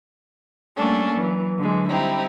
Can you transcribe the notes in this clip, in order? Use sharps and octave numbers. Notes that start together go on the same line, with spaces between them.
G3 A3 A#3 C#4 D4 A4
E3 F#3
D3 E3 F#3 G#3
G3 C4 D#4 E4 G4